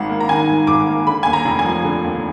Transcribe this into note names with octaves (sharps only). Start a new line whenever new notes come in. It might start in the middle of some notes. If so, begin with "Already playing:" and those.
Already playing: G#1 G#2 D#3 F#5
A#3
A#5
D#3 G#5
G#2
G#1 D6
A#3
D3 B5
D#2 G#5
A#5
F1
G#5
F3
D3
D#2